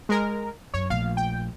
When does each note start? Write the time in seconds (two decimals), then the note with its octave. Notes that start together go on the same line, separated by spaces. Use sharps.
0.09 G#3 A#4
0.74 F#2 C#5
0.90 A#1 A3 F5
1.17 G5